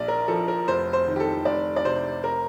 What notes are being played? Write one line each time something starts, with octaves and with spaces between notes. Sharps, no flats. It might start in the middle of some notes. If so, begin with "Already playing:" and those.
Already playing: A#1 D5
A#4
F3 A4
A#4
F1 C5
C5
D#3
G4
A4
F1 D5
D5
C3 C5
A#4